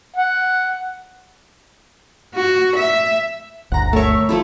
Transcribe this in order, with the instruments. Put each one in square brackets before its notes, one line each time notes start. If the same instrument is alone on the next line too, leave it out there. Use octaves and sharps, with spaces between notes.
[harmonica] F#5
[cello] F#4
E5
[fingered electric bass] G1 D2 [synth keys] F#5 A#5
[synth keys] A3 C#5 [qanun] A#4 E5
[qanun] F3 A3 E4